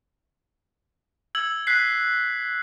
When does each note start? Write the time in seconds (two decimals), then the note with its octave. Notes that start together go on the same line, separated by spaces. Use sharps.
1.35 E6 G#6 F#7
1.67 F#6 B6 C7